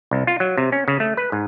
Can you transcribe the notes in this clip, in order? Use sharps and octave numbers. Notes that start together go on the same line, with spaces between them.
C2
F4
F#3
C3
C#4
C#3
A3
B4
G#2